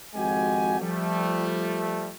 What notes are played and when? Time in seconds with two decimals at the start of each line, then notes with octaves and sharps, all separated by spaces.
0.15 G#1 F2 G#3 F#4 G4 G#5
0.80 F3 G3 A3